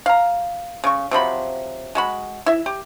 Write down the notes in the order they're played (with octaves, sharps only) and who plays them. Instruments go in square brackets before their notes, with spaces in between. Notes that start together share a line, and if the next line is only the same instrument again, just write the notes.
[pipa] F5 A#5
C#3 C#6
C3 F3 F#3 B5
G#3 F#4 B5
E4 E5
G4